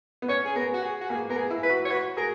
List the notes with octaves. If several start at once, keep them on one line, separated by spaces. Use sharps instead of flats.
B3
C#4 C#5
G#4
B3 A#4
F#4
G#4
F#4
A#3 G#4
B3 A#4
G#4
E4
B4
F#4
C#5
F#4 B4
G#4 A#4